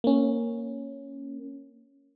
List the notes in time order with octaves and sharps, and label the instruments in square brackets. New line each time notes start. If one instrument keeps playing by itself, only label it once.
[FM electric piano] A#3 C#4